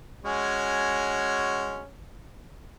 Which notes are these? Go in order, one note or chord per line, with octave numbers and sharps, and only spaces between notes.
G#3 C#4 F#4